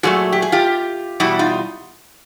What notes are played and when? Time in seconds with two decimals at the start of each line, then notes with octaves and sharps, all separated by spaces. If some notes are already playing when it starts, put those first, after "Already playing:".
0.03 A#2 F#3 A3 F#4 G#4
0.32 G4
0.42 G#4
0.52 F4 G4
1.20 E2 B2 G3 E4 F#4
1.39 D#4 F4